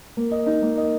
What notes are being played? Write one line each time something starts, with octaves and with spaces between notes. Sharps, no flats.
A#3
D#5
D#4
A#3
D#5